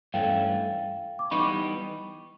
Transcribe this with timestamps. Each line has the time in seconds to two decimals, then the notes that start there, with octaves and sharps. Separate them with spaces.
0.14 G2 E3 A3 C#4 F5 G5
1.19 D6
1.31 E3 G3 B3 D#4 G4 B5 C#6